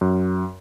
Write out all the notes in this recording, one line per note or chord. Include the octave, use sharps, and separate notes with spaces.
F#2